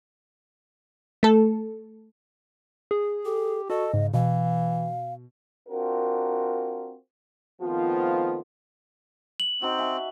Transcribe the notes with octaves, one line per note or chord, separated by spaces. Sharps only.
A3 A4
G#4
G4 A4
F#4 A4 D#5
G#2 C#3
B2 E3 F5
C4 D4 F4 F#4 A#4
D#3 F3 A3 B3 C4 F4
F#7
C4 D#4 F#4
E5 G#5